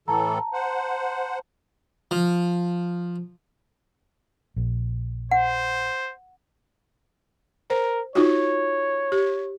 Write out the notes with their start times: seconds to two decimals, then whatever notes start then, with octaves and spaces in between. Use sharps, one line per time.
0.08 A2 E3 A4 A5 A#5
0.53 C5 F#5
2.11 F3
4.56 A#1
5.31 C5 F#5
7.70 A#4 C5
8.15 D#4 F4 F#4 C#5
9.12 G4